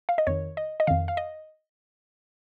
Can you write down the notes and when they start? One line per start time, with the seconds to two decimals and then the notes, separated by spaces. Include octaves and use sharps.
0.09 F5
0.18 D#5
0.27 F2 D#3 C#5
0.57 D#5
0.80 D#5
0.87 F2 D#3 F5
1.08 F5
1.17 D#5